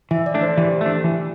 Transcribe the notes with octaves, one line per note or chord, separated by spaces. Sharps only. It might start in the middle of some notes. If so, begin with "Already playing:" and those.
E3 E5
D5
A3 D4
C5
E3 G4
A3 D4
E3